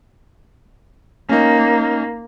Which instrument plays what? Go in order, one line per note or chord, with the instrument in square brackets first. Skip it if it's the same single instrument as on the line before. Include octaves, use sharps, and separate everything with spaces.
[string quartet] A#3 [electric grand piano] C#4 D#4